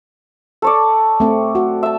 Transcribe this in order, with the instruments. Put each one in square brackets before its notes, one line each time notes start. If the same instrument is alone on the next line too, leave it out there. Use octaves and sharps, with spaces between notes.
[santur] A4 C#5 D5
[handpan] A3 C4
F#4
[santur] E5 A5